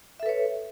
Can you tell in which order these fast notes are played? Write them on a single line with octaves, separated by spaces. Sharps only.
E5 A4 B4 C#5